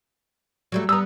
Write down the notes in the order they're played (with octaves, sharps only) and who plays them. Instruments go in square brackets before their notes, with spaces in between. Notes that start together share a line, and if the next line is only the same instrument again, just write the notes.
[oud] F#3 G3 A3
[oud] G3 B3 [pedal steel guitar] A#5 D#6 E6